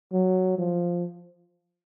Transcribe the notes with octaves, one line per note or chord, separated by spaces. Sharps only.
F#3
F3